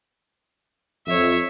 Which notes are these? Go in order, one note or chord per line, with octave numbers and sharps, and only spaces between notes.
F2 C#5 E5